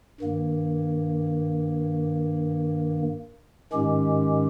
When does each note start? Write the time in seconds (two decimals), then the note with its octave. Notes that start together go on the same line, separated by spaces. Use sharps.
0.21 G2 D#3 A#3
3.72 G#2 D#3 G#3 C#4 G4